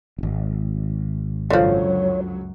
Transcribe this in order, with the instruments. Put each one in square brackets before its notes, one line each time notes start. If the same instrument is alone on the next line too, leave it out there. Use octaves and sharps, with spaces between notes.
[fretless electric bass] D1 G#1
[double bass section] C#2 F#2 F#3 [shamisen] D3 F3 [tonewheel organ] C#5